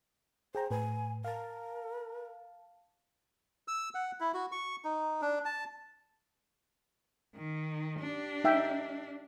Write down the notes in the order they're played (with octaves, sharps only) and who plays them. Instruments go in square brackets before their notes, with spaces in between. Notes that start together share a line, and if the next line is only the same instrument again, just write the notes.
[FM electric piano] G#4 G5 A#5 [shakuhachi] C5
[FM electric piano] A2 B4 [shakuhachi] G#5
[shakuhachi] A#4 [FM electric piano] F5 A5
[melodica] E6
F#5
E4
F#4
C#6
D#4
D4
A5
[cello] D#3
D4 G4
[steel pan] D#4 E5 G5